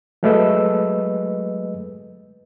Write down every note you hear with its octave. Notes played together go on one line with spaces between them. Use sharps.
F#3 G#3 A3 B4 D#5 E6